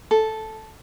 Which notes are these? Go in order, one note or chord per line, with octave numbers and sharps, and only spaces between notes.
A4